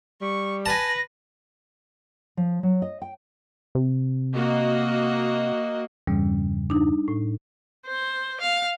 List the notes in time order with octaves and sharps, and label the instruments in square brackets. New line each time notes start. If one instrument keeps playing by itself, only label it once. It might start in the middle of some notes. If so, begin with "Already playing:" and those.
[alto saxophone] G3 [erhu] C#6
[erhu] B4 [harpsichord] G#5 A5 [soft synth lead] A#6
[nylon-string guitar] F3
F#3
D#5
G5
[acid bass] C3
[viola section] A#3 F#4 D#5
[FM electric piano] E2 G2 C#3 [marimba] G3
[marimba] D4 D#4
A2
[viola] C5
F5